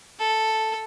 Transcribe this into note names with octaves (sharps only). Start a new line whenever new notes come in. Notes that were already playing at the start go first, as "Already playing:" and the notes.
A4